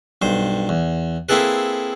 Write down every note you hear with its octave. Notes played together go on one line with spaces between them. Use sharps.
B1 G2 C5
E2
A#3 C4 E4 G#4 A4 B4